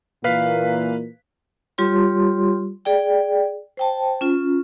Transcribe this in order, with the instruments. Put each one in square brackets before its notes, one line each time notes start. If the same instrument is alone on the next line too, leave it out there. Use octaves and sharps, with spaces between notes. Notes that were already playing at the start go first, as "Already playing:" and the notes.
[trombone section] A#2 E3 A#3 [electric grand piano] B4 F5 B6
[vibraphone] G3 F4 G4 C#5 C6
G#4 D5 G5
C5 G5 A5
C#4 F4